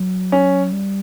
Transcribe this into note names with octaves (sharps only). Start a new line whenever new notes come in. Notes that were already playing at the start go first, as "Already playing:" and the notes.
Already playing: F#3
C#4
G3